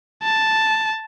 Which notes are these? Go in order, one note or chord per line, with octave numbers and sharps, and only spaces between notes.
A5